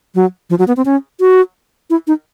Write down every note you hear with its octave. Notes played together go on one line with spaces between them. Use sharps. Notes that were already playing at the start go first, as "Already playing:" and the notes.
F#3
F3
F#3
B3
C4
C#4
F#4
E4
D#4